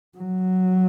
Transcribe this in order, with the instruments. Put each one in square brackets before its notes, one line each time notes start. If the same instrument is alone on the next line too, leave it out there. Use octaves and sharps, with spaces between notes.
[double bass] F#3